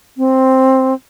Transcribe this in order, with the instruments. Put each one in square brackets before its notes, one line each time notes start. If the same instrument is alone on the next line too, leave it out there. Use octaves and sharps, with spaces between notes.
[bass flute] C4